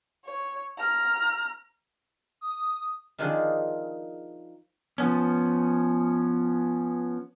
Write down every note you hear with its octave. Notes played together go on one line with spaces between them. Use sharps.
C#5
A#5 F6
D#6
D#3 F3 D4 D#4 G#4
F3 B3 C#4